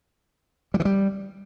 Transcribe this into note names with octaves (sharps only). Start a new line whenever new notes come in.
G3
E3
G3